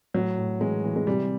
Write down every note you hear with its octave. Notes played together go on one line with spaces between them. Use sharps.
A2 F#3
A2
E3 G#3
E3
G#3
C3 G3